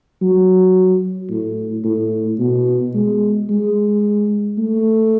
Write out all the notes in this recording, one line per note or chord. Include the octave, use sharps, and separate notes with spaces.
F#3
A2
A2
B2
G#3
G#3
A3